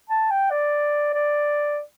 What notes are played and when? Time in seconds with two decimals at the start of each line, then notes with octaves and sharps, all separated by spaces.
0.09 A5
0.30 G5
0.51 D5
1.14 D5